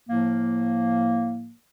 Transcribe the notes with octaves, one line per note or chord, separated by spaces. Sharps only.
A2 F3 A#3